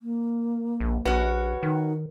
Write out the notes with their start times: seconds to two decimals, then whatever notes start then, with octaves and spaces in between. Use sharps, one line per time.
0.01 A#3
0.80 A#1
1.05 A#1 C#4 F#4 B4
1.63 D#3 D#4